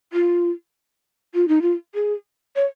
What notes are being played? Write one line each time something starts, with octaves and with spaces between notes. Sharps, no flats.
F4
F4
D#4
F4
G#4
C#5